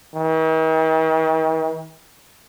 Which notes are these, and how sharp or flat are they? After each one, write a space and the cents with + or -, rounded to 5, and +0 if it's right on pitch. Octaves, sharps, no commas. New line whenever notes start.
D#3 +45